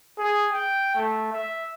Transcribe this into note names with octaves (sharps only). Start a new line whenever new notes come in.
G#4
G5
A3
E5